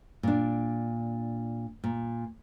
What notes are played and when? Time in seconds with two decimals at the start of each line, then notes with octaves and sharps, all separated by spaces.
0.23 A#2 D4
1.84 A#2